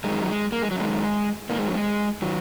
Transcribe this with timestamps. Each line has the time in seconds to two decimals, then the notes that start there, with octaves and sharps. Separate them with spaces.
0.04 F#2 D#3 G#3
0.23 F#3
0.28 G#3
0.52 A#3
0.62 G#3
0.71 F#3
0.76 F#2 D#3 G#3
1.49 G#2 D#3 A#3
1.58 G#3
1.66 F#3
1.75 G#3
2.22 D#3 F#3